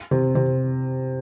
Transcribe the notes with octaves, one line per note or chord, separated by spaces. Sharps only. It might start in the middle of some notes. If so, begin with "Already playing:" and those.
C3
C3